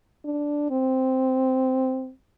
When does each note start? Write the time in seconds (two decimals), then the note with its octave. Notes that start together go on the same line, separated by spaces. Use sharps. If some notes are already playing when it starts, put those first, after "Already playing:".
0.25 D4
0.70 C4